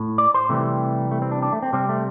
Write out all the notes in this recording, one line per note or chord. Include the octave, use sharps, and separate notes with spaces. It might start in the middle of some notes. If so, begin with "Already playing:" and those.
Already playing: A2
D5
C5
C3 E3 G3 A3
A3
C4
D4
D4
A3
C4
C3 G3 C4
A3